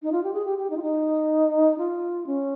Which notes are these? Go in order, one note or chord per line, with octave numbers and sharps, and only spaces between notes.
D#4
F4
G4
G#4
G4
G4
D#4
F4
D#4
F4
C#4